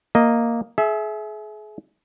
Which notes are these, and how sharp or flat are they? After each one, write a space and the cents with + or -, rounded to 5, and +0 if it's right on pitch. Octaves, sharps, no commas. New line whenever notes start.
A#3 -5 D#5 +0
G#4 +35 E5 -5